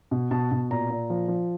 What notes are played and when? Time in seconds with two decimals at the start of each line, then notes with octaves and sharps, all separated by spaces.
0.11 B2
0.31 B2 A5
0.52 B2
0.71 A#2 A#5
0.90 A#2
1.10 F3
1.28 F3